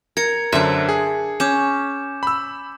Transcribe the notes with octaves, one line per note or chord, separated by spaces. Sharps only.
A#4 G#6 C#7
F#2 D3 D4 C5 E5
G#4
C#4 D6 G6 E7
B5 E6